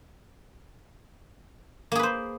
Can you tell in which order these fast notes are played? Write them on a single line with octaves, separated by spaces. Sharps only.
A#3 G#4 B4 C5